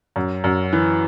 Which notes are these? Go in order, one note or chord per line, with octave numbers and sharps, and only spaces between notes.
F#2
F#2
E3